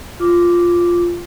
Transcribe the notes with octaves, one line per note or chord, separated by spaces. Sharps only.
F4 D6